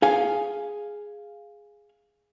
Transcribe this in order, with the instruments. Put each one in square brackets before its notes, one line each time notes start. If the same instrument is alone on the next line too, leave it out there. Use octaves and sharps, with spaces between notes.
[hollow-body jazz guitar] G#4 F5 G#5